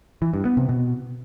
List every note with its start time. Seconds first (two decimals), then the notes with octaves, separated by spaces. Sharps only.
0.22 E3
0.34 G2
0.45 B3
0.57 C3
0.69 B2